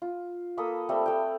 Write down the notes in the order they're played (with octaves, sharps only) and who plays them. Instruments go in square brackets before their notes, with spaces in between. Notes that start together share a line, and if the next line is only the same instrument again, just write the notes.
[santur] F4
A#3 A4 B5 D#6
G3 A3 C4
A3 G5